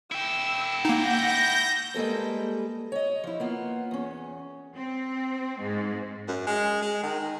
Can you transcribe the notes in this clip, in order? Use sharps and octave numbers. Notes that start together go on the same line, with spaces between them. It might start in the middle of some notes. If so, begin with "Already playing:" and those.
E4 G5 E6
A#3 D#4 F#5 G6 A#6
G3 G#3 A#3 A4 B4
C#5 D#5
F3 E4
A#3 B3 F4
E2 C#4
C4
G#2
F#2
G#3
G#3
D#3